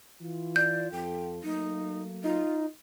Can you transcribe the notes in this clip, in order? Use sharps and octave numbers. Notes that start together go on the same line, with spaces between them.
E3 F4
D5 G6
F2 F4 A4 G5
F#3 A3 A#3 D#4
D#4 F4